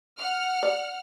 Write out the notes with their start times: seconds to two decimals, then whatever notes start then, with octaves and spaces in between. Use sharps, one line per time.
0.17 F#5 F6
0.63 D5